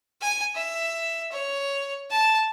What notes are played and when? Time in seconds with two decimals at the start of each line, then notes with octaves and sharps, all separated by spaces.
0.21 G#5
0.55 E5
1.32 C#5
2.10 A5